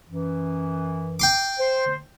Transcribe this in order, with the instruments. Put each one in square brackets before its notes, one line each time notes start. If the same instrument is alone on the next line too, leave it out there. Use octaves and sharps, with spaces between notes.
[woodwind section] F#2 E3
[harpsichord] G5 C6 D6
[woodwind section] C5